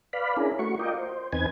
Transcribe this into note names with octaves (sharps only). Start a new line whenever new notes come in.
B4 D5 F5 B5
C#4 D4 E4 G#4 A#4
A3 F#4 C#6
F4 A#4 D5 D#5 G5
C5
E2 C4 D#4 B4 G#5 G#6